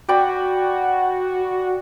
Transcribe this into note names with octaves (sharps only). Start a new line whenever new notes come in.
F#4 D5 G5 B5